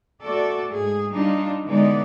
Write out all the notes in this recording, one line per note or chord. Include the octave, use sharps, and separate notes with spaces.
A3 F#4 A4 D5
G#2 G#4
G3 D4 D#4 F4
D3 E3 G#3 B3 D#4 D5